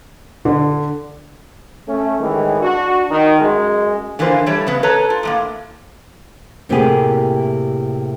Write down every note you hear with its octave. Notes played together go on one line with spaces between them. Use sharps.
D3
A3 C#4
A2 D#3 E3 G#3
D4 F#4
D#3
F#2 G#3
D3 E3 A#3 F4 A#4 C5
E3 G3 A3 C#5
C#3 B3
A4 B4 C#5 A5 A#5
F4
A2 G#3 A#3
A2 C3 A#3 E4 G4 G#4